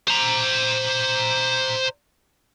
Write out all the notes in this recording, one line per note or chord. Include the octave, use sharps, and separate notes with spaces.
C5 A#5